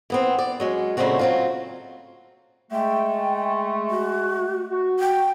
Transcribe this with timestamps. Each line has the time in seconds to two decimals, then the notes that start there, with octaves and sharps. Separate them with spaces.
0.10 E3 B3 C4
0.38 D5
0.60 F#3 G#3 C#4
0.97 A#2 C#3 G#3 A3 C4 F#4
1.19 F#3 C4 F4
2.72 G#3 A3 G5
3.90 F#4
4.71 F#4
5.00 G5